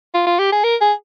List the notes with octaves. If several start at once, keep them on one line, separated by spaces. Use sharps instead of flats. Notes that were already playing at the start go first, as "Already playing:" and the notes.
F4
F4
G4
G#4
A#4
G#4